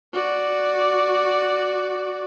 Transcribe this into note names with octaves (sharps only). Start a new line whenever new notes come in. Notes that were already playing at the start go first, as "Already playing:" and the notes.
F#4 D5